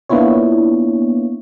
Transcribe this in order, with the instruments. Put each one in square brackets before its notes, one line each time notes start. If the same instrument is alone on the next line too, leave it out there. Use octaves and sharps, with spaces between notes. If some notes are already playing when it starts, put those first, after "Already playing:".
[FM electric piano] A#3 B3 D4 E4 F4 C#5